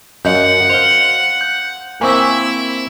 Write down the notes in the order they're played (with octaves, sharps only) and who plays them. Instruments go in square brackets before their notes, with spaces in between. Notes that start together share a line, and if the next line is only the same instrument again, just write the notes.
[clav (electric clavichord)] F#2 [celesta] D#5 F5 G6 [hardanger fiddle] F#5
[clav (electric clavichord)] C5 F5 [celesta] F7 G7
[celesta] G6
[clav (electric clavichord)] A#3 C4 [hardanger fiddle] E4 E5 [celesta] G#5 C#6 E6